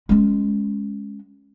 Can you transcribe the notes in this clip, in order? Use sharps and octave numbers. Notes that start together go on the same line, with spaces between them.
G#3 C#4